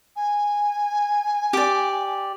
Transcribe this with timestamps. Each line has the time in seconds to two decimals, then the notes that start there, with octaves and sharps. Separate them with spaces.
0.16 G#5
1.53 G4 D5